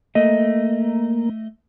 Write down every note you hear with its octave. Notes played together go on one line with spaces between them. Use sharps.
A3 A#3 D#5